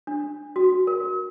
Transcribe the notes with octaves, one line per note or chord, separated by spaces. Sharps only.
D4
F#4
A#4